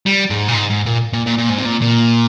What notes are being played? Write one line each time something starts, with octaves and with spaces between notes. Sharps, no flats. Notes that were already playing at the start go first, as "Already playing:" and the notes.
G3
G#2
A#2
G#2
G#2
A#2
A#2
A#2
A#2
G#2
C3
A#2
A#2